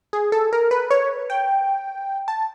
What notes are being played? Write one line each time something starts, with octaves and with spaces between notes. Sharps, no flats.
G#4
A4
A#4
B4
C#5
G5
A5